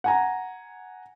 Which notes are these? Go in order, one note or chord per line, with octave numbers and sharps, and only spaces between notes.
F#5 G#5 A#5